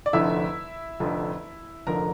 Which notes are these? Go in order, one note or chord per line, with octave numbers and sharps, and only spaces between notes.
D5
F1 F2 D3 F3 E4 E5
F1 F2 D3 F3
F1 F2 D3 F3 A#4 A#5